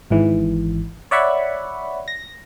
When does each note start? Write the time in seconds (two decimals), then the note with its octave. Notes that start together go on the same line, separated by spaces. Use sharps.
0.11 G#1 G#2 E3
1.11 C#5 D5 E5 F#5 B5 C#6
2.08 A#6